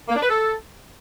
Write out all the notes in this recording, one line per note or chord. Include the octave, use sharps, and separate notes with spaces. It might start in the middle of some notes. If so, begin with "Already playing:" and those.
A#3
D4
B4
A4